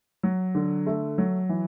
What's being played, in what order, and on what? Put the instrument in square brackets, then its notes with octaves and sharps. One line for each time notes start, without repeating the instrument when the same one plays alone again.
[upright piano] F#3
D3
A3
F#3
E3